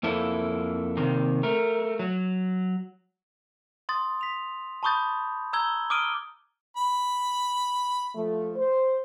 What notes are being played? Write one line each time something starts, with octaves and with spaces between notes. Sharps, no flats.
F2 A#3 E4 A4
C3 D#3 A#3
A3 A#4
F#3
C6 D#6 A6
B6 F7
A5 B5 C#6 D#6 G6 A6
A#5 E6 G6 G#6 G7
D6 D#6 F6 D7 D#7 G7
B5
F3 A3
C5